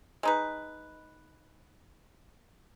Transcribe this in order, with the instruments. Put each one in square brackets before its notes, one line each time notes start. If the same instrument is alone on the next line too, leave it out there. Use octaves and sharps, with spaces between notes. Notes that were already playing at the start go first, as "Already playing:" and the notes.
[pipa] G#3 D#4 B4